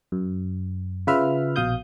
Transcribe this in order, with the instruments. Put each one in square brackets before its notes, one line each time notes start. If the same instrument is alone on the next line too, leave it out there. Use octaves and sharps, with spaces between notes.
[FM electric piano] F#2
C#3 F4 B4 E5 F6
A#1 B2 F5 D#6 G6